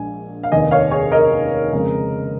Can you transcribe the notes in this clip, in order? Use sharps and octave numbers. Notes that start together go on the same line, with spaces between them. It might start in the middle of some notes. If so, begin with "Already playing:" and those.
Already playing: A#1 A#2 G#3 G#5
F5
F1 D#2 D#3 D#5 G#5
C#5 F5
G#4 C#5
A#4 D#5
F2 C#3 G#3